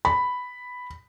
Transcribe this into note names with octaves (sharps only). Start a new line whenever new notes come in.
B5